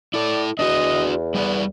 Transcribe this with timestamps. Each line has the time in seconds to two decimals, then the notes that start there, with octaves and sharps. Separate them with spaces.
0.14 E4 A4 D5
0.59 E2 D4 F#4 D#5
1.35 G3 B3 E4 D5